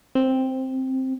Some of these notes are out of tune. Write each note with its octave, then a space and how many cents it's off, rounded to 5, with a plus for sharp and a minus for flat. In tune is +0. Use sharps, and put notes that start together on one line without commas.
C4 +5